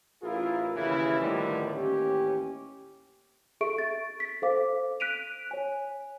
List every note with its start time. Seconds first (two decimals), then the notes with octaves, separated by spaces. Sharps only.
0.22 A1 E4 F4 G#4 A#4
0.75 D#2 C#3 E3 E4
1.20 A2 D3 D#3 F3 G3 B3
1.76 A1 D#2 C#4 G4
3.61 G#4 A4 E5 C#6 D7
3.78 A6
4.20 B6
4.42 A4 C5 F5 D6
5.00 F#6 B6 D7 D#7 F7
5.51 C#5 G#5